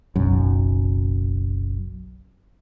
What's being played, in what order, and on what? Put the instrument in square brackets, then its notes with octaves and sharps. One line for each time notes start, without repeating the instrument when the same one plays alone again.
[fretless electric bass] F#1 B1 F#2